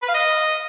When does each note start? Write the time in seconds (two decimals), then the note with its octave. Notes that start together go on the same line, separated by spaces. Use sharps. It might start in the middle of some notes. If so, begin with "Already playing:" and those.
0.03 B4
0.08 F5
0.14 D#5